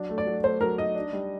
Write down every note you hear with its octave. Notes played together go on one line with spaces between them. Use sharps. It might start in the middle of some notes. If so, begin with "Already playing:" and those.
Already playing: F#3 D4
A3
D5
F#3
A3 C5
F#3 A#4
D#4 D#5
D4
G3